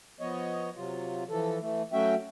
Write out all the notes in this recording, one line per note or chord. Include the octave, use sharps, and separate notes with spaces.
F3 B3 C#5 D#5
C3 F#3 F4
E3 F3 A4
E3 A3
F#3 A3 C#4 F#4 E5 G5